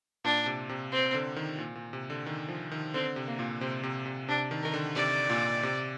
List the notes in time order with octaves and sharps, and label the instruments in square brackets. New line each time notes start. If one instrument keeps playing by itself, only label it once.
[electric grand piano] A#2 [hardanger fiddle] D4
[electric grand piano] C3
C3
[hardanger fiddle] C4
[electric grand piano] D3
D#3
A#2
A#2
C3
D3
D#3
F3
D#3
[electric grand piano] D3 [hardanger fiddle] C4
[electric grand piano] C3
[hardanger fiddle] A#3
[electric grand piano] A#2
[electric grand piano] C3 [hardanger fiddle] C4
[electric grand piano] C3
C3
[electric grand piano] C3 [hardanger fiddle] D4
[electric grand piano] D#3
[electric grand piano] D#3 [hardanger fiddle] A#4
[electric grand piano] D3
[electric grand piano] C3 [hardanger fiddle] D5
[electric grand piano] A#2
C3